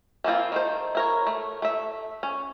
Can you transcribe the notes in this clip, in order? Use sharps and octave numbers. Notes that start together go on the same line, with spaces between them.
E3 F3 A#3 C4 F4
D#3 A3 C5
E4 A#4 C#5
A3
A3 E5
C#4